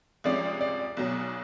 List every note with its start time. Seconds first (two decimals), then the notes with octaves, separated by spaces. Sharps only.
0.24 C2 C3 F3 G#3 C#4 D5
0.61 D5
0.97 B1 B2 F#3